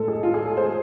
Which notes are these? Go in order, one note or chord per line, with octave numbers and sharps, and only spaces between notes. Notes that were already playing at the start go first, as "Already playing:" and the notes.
Already playing: A2 G#3 A4
G#4
F4
G#4
A4
C5